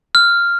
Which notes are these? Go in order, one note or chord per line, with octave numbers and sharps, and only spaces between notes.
F6